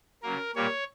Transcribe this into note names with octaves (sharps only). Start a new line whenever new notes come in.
C#3 F#3 A#3 A#4
A#2 G3 A#3 C#5